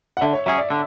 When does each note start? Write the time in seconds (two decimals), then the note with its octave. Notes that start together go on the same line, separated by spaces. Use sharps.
0.17 F#5
0.21 D3 E5
0.33 C#5
0.46 F#3 C#4 G#4 E5
0.58 D5
0.70 D3